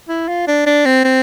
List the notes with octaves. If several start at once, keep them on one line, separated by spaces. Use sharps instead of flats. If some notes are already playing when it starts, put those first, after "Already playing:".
E4
F4
D4
D4
C4
C4